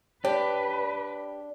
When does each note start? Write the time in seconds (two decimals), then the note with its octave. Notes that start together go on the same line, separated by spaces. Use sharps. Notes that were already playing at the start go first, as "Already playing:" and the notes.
0.25 D4 G4 B4 C#5